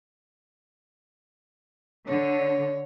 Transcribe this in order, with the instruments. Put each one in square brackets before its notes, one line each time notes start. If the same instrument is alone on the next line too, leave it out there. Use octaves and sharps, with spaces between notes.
[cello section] D3 [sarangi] C#5